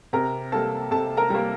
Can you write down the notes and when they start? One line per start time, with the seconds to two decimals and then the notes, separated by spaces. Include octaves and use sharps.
0.13 C3 A#4 A#5
0.52 G3 A#3 A4 A5
0.91 C3 A4 A5
1.17 A#4 A#5
1.30 G3 A#3